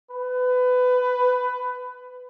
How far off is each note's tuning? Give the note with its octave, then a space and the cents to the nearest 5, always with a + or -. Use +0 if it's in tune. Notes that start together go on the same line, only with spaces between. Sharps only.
B4 +20